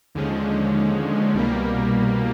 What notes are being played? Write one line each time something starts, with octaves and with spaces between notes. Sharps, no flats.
D#2 D3 F3 G#3 C#4
C2 B2 G3 A#3